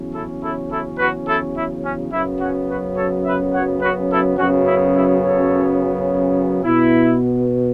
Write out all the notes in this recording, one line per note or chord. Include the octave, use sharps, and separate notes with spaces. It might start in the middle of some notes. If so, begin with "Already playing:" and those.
Already playing: E2 C#3 F#3 C#4
E4 A4
E4 A4
E4 A4
F#4 B4
E4 A4
E4
C#4
F#2 C#3 F#3 B3 E4
C#4 F#4
F#4 B4
A4 C#5
B4 E5
C#5 F#5
F#4 B4
E4 A4
F#2 C#3 F#3 B3 C#4 F#4
E4
E4
A4 C#5
B2 B3 E4